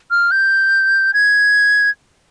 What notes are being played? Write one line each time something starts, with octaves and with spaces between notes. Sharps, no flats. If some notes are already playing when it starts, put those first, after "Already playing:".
F6
G6
G#6